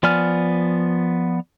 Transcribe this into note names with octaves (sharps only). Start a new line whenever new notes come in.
F3 B3 D5 G#5 F6